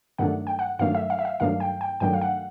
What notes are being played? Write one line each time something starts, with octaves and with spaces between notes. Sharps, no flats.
G2 D#3 F#3 A3 D4 F#5
G5
F#5
G2 D#3 F#3 A3 D4 F5
E5
F5
E5
F5
G2 D#3 F#3 A3 D4 F5
G5
G5
G2 D#3 F#3 A3 D4 G5
F5
F#5